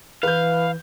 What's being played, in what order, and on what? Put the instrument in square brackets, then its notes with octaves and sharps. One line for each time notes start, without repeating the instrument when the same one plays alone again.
[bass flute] E3 [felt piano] B4 G6 [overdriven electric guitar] F5